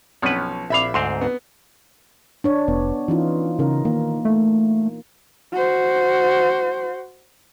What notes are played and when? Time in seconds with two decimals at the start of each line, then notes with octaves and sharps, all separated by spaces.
0.22 B1 F3 C#4 B4
0.70 A#1 E5 F5 B5 D6
0.94 D2 G#2 C4 C6
1.21 B3
2.44 D4 C#5 D5
2.68 F1 B3
3.08 E3 C#4 D#4 F4
3.59 C#3 D#4 A#4
3.85 D#3 A#3
4.25 A3
5.53 F#4 C5